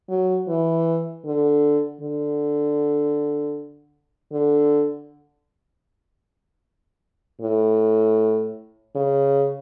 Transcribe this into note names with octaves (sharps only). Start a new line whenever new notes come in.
F#3
E3
D3
D3
D3
A2
C#3